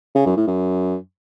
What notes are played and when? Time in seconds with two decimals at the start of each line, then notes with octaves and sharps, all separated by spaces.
0.15 C#3
0.26 F#2
0.37 A2
0.48 F#2